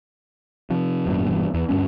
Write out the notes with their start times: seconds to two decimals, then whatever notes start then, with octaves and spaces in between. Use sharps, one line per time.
0.70 C3 F3
1.06 G#1 F#2 A#2
1.25 E1 E2 G2
1.54 E2
1.69 D2 G2 G#3 C#4